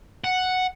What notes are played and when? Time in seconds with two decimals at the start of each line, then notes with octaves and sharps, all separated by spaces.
0.24 F#5